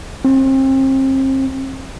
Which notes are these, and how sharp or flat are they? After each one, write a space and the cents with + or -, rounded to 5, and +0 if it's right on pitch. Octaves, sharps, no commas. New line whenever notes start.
C4 +35